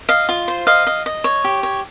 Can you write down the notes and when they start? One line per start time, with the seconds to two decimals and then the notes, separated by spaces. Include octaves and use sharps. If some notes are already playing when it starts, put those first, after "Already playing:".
0.08 D#5 F5
0.29 F4
0.48 C5
0.67 D#5 F5
0.87 D#5
1.06 D#5
1.24 C#5
1.44 G4
1.63 C#5